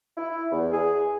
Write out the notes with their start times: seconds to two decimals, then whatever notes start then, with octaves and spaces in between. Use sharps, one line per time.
0.17 E4
0.51 E2
0.72 G#4